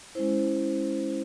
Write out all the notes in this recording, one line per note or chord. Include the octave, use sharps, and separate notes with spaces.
G#3 C#4 E4 C5